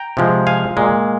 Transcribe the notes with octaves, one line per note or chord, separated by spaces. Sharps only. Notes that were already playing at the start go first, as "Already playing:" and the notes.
Already playing: G5 A#5
C3 F3 G#3
F5 G#5
A#2 G#3